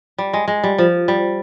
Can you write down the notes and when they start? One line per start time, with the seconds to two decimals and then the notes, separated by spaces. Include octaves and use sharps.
0.18 G3
0.33 G#3
0.48 G#3
0.63 G3
0.78 F3
1.08 G3